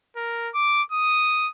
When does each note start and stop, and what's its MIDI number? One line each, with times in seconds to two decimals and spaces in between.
0.17 0.50 70
0.54 0.83 86
0.92 1.49 87